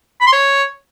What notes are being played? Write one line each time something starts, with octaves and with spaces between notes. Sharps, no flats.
B5
C6
C#5